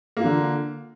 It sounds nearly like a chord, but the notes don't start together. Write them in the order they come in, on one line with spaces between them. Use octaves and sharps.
A#3 F4 D3